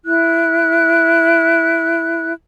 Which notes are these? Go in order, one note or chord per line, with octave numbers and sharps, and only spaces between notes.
E4 F#6